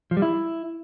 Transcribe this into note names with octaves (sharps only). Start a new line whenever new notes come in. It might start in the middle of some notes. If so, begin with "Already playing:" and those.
F3
G3
E4